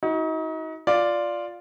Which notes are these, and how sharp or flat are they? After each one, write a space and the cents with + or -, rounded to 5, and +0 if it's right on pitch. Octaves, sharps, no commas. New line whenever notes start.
D#4 +35 F#4 +0
F4 +0 D5 +0